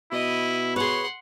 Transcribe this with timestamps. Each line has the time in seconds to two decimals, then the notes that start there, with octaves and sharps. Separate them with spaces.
0.12 B2 E4 D#5
0.76 G#4 B4 C#5 F#5 C6